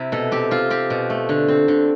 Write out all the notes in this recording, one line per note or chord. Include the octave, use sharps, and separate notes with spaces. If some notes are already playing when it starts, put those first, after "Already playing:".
Already playing: C3 E4
B2 A4
C4 G4
C4 F4
C4 G4
B2
A3
D3
C4
D3